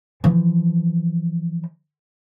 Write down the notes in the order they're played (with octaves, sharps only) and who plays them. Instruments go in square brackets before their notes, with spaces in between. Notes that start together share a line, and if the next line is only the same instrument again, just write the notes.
[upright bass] E3 F3